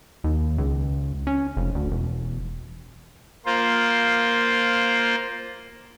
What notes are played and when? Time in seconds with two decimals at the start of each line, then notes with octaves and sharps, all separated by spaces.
0.24 D#2
0.58 C#2
1.27 C#4
1.57 F1
1.75 D2
1.91 E1
3.46 A#3 F4 C5